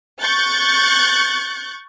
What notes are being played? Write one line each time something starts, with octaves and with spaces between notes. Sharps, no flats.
C#6 F#6 G6 A6 C#7